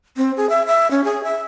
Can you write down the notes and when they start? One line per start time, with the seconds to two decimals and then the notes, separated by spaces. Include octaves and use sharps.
0.17 C4
0.37 G#4
0.49 E5
0.67 E5
0.91 C#4
1.04 G#4
1.24 E5